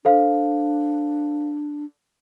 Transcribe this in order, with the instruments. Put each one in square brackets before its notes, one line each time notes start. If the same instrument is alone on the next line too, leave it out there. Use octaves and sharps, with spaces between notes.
[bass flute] D4 [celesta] A4 C5 F5